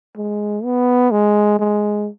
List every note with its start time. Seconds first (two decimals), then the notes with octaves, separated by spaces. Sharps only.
0.16 G#3
0.64 B3
1.11 G#3
1.59 G#3